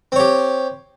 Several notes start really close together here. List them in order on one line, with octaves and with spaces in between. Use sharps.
C4 C#5 G4